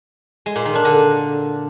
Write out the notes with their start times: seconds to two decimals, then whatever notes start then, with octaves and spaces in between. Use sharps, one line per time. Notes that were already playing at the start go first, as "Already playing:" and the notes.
0.46 G#3
0.56 A#2
0.65 D#3
0.75 D4
0.85 D3